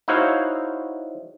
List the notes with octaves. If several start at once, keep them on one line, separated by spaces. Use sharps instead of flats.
D#4 E4 F#4 C5 C#5 F5